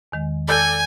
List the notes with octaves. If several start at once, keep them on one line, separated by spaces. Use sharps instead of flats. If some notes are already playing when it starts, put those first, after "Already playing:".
E2 D#3 G#3
A4 D5 G#5 A5 E6 F6 G6